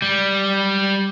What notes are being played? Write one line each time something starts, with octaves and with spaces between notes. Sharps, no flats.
G3